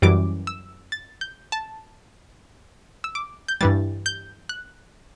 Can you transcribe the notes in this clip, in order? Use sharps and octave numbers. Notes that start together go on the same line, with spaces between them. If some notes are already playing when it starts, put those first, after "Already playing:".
F#2 E3 G3 D6
E6
A6
G6
A5
E6
D6
G6
G2 E3 G3 A6
G6
F#6